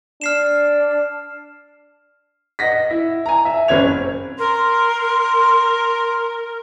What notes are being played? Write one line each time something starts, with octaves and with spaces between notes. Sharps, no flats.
D4 F6 C7 E7
D#5 F#5 A#6 B6
E4
G#5 A#5
E5
F#1 C#4 G#6 F7
C4
A#4 C6